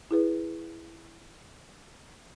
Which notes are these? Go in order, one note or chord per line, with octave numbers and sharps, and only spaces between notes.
E4 G#4 B4